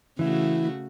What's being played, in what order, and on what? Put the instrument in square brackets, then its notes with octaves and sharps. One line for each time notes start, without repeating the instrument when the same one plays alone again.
[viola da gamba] C#3 A3 F#4 [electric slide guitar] E3 E4